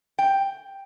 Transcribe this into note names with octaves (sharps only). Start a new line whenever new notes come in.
G5